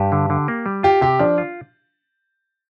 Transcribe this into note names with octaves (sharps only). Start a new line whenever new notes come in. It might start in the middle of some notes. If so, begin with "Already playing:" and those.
Already playing: G2 G4
D3
D3
A#3
G3
F4 G4
C3 G4
F3 D4
F4